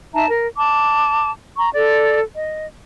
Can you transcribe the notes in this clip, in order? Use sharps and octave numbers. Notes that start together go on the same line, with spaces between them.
D#4 E5 A5 A#5
A#4
A5 D6
A#5 C#6
A4 D5
D#5